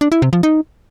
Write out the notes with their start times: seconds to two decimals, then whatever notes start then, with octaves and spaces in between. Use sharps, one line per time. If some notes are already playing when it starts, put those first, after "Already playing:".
0.01 D4
0.12 E4
0.22 C3
0.33 F3
0.43 D#4